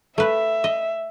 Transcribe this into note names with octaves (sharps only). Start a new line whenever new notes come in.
A3 B4 E5
D#5